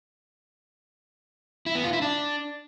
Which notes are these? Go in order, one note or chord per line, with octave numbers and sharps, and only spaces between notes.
E4
B3
F4
E4
D4